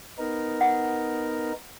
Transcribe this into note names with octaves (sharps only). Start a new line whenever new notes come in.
B3 D#4 A#4
F#5